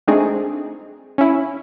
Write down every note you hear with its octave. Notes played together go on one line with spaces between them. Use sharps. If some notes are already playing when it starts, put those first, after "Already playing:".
G#3 A3 C4 D4 D#4 G#4
C#4 E4